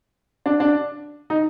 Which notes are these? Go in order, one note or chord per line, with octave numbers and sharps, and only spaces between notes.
D4
D4
D#4